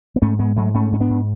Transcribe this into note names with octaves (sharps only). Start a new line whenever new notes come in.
B3
G#2 A3 C#4
G#2 G#3 B3
G#2 F#3 A3
G#2 A3 C#4
G#2 C#4
B3 D4
G#2